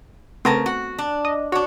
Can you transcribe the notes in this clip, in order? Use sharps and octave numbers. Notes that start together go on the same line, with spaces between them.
C#3 A3 B3 C4 A#4 A5
F#4
D4
D#5
D4 F#4 C#5